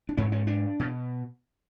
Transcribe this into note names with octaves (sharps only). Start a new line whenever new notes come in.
D4
G#2 C#4
C#4
D4
B2